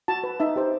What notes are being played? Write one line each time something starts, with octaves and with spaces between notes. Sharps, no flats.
F#4 A5
B4
D#4 E5
G4 C5